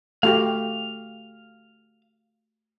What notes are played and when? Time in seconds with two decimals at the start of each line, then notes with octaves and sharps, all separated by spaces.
0.23 A3 F#4 G4 F5